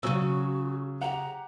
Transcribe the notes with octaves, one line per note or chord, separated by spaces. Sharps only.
C#3 F#3 C#4 F#4 E6
G4 F#5 A#5